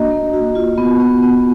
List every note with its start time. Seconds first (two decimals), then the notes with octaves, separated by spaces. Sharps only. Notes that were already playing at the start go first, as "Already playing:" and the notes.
Already playing: A#3 D4 F#4 D#5
0.11 A#3
0.34 F#4
0.55 F4
0.78 B3
1.00 B3
1.22 B3